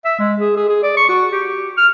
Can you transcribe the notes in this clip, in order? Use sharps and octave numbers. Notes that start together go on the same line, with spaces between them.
E5
G#3
G#4
G#4
G#4
D5
C#6
F#4
G4
F6